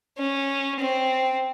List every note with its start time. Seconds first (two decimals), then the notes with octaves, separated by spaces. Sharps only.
0.18 C#4
0.80 C4